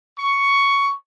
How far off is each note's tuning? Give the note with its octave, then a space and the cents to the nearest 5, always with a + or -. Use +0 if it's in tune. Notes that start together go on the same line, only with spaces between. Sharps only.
C#6 +10